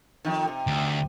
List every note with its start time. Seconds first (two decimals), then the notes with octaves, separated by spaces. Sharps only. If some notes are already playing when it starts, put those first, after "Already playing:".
0.25 F2 D#3
0.47 C3
0.67 D2